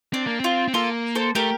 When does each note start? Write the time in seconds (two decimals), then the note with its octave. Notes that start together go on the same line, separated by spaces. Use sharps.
0.13 C4 D4
0.27 A#3
0.40 C4 F4
0.68 C4
0.74 A#3 F4 A4
1.15 A4 C5
1.35 A3 G4 A#4